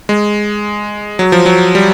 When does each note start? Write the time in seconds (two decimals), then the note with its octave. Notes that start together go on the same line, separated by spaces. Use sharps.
0.09 G#3
1.19 F#3
1.32 F3
1.46 F#3
1.75 G3